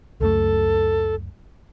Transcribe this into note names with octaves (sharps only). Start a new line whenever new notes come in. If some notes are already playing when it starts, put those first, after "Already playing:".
C#2 F#2 A3 A4